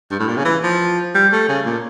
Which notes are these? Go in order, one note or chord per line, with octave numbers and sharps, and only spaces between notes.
G2
A2
A#2
C#3
E3
F3
G3
A3
C#3
A#2